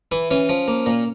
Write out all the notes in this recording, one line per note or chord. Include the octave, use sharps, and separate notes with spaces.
E3 E4
E3 C#4
F3
A#3
A#2